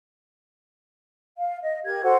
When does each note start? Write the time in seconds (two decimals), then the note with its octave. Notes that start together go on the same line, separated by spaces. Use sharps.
1.38 F5
1.62 D#5
1.85 G4 A#4 G#6
2.03 F#4 A4 C5 F#5